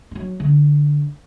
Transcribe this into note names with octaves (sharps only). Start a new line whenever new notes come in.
F#3 G3
D3